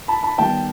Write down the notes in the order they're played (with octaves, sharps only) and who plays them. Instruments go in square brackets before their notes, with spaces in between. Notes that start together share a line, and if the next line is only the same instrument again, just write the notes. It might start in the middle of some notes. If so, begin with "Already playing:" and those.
[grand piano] A5 B5
A5 B5
D#3 G3 B3 G5 A5